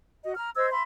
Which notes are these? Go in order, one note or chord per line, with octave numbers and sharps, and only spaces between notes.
F#4 D#5
A#5 F6
C5 D#5 E6 G#6
E5 B5 C6